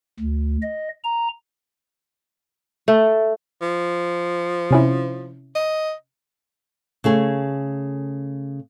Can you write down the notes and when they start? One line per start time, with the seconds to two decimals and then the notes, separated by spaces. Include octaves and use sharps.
0.20 D2
0.62 D#5
1.04 A#5
2.88 A3
3.61 F3
4.71 C3 C#4 E4
5.55 D#5
7.04 C#3 A3 G#4